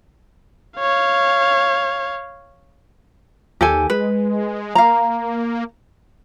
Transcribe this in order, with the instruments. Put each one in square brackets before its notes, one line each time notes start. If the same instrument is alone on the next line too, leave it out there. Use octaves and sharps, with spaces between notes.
[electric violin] C#5 F5
[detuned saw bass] D#2 [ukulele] G4 A4 G#5
[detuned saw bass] G#3 [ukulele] B4
[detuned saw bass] A#3 [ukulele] F5 A#5